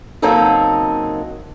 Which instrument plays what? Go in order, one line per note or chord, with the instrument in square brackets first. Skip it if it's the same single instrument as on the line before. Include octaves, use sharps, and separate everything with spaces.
[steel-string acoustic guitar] C#3 F#3 A#3 C4 D#4 A4